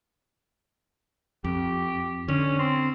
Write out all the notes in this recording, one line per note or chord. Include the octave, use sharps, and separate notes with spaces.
F2 G4
D3 C#4
C4